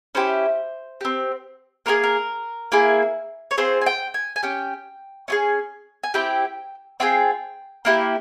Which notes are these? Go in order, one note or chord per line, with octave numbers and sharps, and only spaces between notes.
C#4 E4 G4 C5
C4 G4
A#3 F4 G#4 A#4
A#4
A#3 E4 G#4
C#5
C4 F4 G#4 C5
G#5
G5
G#5
G#5
C#4 G4 G5
C#4 F4 G#4
G#5
C4 E4 G4 G5
C4 F4 G#4 G5
A#3 E4 G4